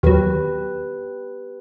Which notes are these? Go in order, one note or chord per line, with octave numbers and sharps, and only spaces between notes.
D#2 F#3 G4 B4